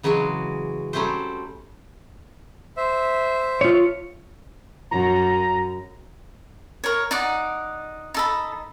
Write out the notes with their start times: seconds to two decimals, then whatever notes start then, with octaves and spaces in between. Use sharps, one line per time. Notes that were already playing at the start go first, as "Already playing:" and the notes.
0.03 C#3 E3 F#3 G#3 F#4
0.93 F#3 G3 A3 C#4 C5
2.77 C5 E5
3.61 F4 C#5
4.91 F#2 A#5
6.84 A#4 C#5
7.11 D#4 D5 F#5
8.14 D#4 A4 B5